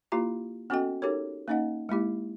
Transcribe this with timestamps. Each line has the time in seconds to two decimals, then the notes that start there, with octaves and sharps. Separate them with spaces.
0.12 A#3 E4 F4 G4 A#5
0.70 B3 C#4 F#4 A4 D#5 G5
1.02 D#4 G4 A4 A#4 C#5
1.48 A#3 C#4 D#4 D#5 F#5
1.89 G#3 A#3 E4 G4